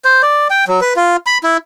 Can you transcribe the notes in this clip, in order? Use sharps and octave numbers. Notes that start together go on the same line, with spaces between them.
C5
D5
G5
F#3
B4
F4
B5
E4